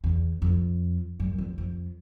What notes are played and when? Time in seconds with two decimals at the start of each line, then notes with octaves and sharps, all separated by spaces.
0.04 E2
0.42 F2
1.20 F#2
1.38 F2
1.58 F2